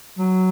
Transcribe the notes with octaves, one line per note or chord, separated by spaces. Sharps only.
F#3